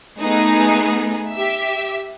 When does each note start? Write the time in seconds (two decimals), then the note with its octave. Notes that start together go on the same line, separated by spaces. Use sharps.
0.20 A3 B3 D#4 G#4
1.32 G4 E5